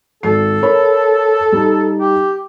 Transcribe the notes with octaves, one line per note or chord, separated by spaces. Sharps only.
G#1 A4 C7
A#4 C#5 B5
G3 D#4
G4